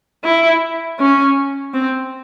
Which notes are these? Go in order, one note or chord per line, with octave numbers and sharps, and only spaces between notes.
E4
C#4
C4